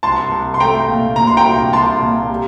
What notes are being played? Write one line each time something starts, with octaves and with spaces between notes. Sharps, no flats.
C2 A5 C6
C2
C6
A3 G5 A#5
A#2
A#2 A#5
C6
G5 A#5
C2
C2 A5 C6
A#2
G3